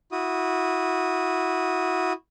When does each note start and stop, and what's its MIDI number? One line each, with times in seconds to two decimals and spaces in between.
0.12 2.13 64
0.12 2.13 66
0.12 2.13 87